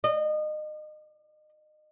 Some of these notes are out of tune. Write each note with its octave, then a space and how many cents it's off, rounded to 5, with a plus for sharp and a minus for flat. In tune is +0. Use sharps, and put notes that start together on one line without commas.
D#5 -30